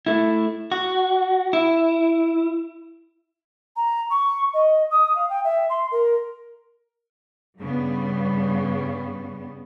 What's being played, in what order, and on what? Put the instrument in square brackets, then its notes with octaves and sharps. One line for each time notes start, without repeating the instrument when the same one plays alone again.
[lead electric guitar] A3 E4
F#4
E4
[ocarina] A#5
C#6
D#5
D#6
F5
G5
E5
C6
A#4
[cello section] G2 C#3 G3 B3